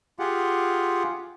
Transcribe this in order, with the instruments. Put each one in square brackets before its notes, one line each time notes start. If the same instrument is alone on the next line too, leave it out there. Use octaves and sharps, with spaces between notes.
[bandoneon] F4 G4 G#4 F#5